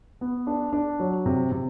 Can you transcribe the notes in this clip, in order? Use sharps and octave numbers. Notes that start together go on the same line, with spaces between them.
B3
D4
D4
F#3
C3
C3